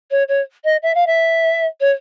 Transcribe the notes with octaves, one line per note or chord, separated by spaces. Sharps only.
C#5
C#5
D#5
E5
F5
E5
C#5